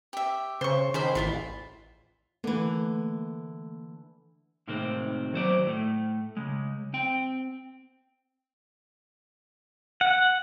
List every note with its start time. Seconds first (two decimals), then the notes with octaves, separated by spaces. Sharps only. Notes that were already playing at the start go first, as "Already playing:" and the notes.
0.13 G4 E5
0.61 C#3 C5 C#6
0.94 D#3 G#4 C5 B5
1.15 A1 E4 F4 B5
2.44 D3 E3 A3 A#3
4.68 A2 C3 D#3 G#3 A#3 C4
5.33 D#3 F#3 C5 D5
5.66 A2 A3
6.37 C#3 G#3
6.94 C4 G5
10.01 F#5